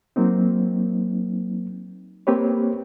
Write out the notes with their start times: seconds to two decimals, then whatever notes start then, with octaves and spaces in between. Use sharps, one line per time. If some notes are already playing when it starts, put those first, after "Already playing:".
0.16 F#3 A#3 C4 D#4
2.27 A#3 C4 G4 B4 C#5